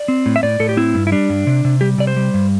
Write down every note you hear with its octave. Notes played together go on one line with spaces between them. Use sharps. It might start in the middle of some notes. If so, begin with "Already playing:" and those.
Already playing: D5
C4
A2
E5
A2 D5
A2 A4
G4
C4 E4
G2
E4
G3 D4
G2
C3
C3
G3 G4
C3 D5
C5
G3
G2